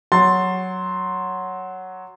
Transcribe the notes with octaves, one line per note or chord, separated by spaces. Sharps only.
F#3 C6 A6